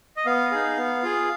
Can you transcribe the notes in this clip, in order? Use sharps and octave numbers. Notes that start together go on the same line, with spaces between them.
D#5
B3 F5
D#4 G#4
B3
F4 G#4